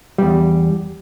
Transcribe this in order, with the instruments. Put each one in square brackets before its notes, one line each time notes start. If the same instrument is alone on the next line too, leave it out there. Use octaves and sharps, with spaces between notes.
[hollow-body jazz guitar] E2 G3